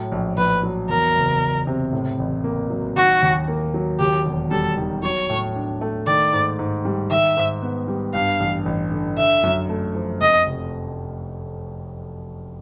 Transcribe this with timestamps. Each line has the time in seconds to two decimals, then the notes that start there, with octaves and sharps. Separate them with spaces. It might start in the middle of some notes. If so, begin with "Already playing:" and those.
Already playing: A2 F#3
0.12 A#1
0.37 A#1 B4
0.63 F#3
0.89 E2 A#4
1.16 F#1
1.41 F#1
1.67 C3
1.93 A2
2.19 A1
2.44 A#3
2.70 F#3
2.96 D#3 F#4
3.22 D#2
3.48 A#3
3.74 F#3
4.00 D#2 G4
4.26 E1
4.51 G3 A4
4.77 D#3
5.03 F#3 C#5
5.30 A2
5.56 D4
5.81 A3
6.07 D#3 D5
6.33 G#2
6.59 G#2
6.85 G3
7.11 D#3 E5
7.37 G#2
7.62 B3
7.88 G3
8.14 G2 F5
8.40 A1
8.66 A1
8.92 D3
9.17 D3 E5
9.43 F#2
9.69 A3
9.95 F3
10.21 F2 D#5
10.47 F1